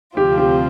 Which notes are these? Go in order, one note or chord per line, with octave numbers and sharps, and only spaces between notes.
D2 C3 F3 C4 F4 G4
G4